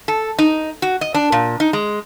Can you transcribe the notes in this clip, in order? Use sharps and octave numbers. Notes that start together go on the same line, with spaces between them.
A4
D#4
F#4
D#5
D4
A#2
D#4
G#3